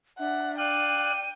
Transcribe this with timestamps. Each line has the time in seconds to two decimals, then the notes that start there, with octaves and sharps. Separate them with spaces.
0.19 D4 E5 F#5
0.58 D5 F5 G5 F#6 D#7